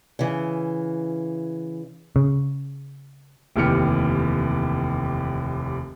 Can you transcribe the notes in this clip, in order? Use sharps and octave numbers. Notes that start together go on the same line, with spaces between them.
C#3 E3
C#3
F1 D#2 E3 G4 F6 C#7